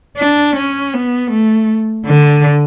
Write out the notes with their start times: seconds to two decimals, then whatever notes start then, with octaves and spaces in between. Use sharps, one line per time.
0.17 D4
0.56 C#4
0.94 B3
1.31 A3
2.06 D3